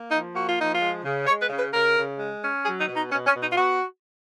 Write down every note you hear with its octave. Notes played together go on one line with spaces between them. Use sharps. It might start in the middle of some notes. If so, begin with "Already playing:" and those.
Already playing: A#3
F3 D#4
A#3 F#4
F4
F3 D#4
F4
G#3
C#3
G#3 C#5
B4
C#3
B4
C#3 A#4
C#3
G#3
C#4
F#3 G#4
D#4
B2
D#4
B2 C#4
C#4
B2
D#4
F4
B3 F#4